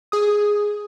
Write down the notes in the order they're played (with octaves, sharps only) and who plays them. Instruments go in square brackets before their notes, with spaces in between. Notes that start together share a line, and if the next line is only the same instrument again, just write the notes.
[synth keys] G#4 D#6